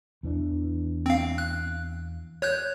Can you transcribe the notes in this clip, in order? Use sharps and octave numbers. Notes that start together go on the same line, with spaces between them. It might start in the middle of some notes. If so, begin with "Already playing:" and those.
E2 E3 D4
C4 F5
F#6
C#5 F#6 G6